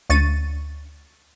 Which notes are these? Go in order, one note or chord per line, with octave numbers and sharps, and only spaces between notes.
D2 C#6 A6 D#7